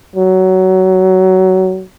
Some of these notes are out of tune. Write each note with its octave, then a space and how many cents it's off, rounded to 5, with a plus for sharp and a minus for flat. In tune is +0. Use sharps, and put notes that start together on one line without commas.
F#3 +20